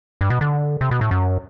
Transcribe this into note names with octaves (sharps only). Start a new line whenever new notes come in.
G2
B2
D3
C3
B2
A2
F#2